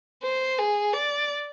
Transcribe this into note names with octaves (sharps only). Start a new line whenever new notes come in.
C5
G#4
D5